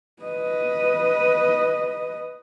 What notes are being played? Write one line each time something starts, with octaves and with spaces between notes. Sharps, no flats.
B4 D#5